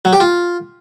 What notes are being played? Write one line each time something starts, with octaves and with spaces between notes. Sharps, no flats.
F#3
G4
F4